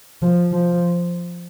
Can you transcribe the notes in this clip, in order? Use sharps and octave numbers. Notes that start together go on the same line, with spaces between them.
F3
F3